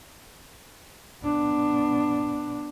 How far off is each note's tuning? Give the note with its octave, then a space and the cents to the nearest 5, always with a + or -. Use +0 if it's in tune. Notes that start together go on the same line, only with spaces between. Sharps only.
B3 +0 D4 +5